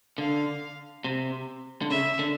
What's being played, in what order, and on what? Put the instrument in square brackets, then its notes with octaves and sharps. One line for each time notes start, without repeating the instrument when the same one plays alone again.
[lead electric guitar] D3 [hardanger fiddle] F5
[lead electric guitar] C3
D3
[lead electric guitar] C#3 [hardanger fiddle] E5
[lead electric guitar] D3